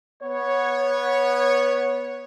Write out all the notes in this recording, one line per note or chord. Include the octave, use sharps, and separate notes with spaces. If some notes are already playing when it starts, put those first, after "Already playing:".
B3 C#5